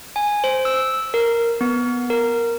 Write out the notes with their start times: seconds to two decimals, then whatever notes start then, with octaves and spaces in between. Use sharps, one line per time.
0.16 G#5
0.44 C5
0.65 E6
1.14 A#4
1.61 B3
2.10 A#4